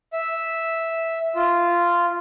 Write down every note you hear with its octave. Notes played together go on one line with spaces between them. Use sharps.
E5
F4